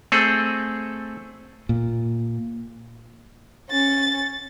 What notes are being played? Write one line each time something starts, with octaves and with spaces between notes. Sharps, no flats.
A3 C4 G#4 A4
A#2
C#4 A6